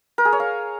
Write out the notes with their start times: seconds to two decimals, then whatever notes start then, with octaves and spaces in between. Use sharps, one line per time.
0.18 A#4
0.25 G#4
0.32 C#5
0.40 F5